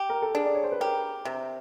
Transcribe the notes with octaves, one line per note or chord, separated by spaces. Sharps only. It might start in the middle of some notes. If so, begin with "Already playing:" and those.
Already playing: G4
A#4
A4
D4 G#4
D5
C#5
C5
B4
G4 A#4
C3 C5